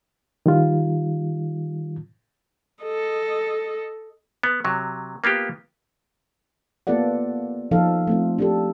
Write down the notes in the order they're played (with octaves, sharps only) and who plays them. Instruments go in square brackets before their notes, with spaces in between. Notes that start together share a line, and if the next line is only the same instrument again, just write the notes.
[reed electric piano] D#3 G3 F4
[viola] A4 D#5
[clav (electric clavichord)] B3
C3 F#3
A#3 B3 F4 G4
[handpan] A#3 B3 F4 A4 D5 F#5
F3 D#4 A4 F5
A3 C4 F4
D4 G4 A4